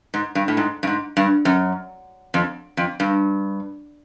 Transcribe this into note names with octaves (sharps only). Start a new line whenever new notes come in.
G#2
G2
A2
G#2
G2
G#2
G2
F#2
F2
F2
G2